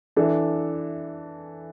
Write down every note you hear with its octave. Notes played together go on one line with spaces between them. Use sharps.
E3 D4 A4